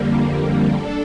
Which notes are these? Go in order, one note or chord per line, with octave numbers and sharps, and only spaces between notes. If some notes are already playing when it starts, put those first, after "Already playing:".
Already playing: F2 D3 G3 A#3
D4 A4